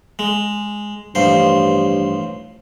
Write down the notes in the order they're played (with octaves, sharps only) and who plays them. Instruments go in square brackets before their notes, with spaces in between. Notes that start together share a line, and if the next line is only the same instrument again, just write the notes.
[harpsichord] G#3
[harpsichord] A1 F3 C5 [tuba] G2